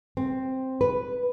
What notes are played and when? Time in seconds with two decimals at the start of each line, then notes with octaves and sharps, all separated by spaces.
0.17 C4
0.81 B4